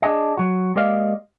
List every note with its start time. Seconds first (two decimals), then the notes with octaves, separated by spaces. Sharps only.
0.02 D4 G#4 D#5
0.37 F#3 F#4
0.76 G#3 A#3 G4 D5 D#5 F5